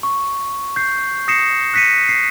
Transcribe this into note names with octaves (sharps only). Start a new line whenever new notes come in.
C#6
G6 C7
D#6 A#6 C7 C#7 E7
F#6 A#6 B6 C#7 D#7
C7 C#7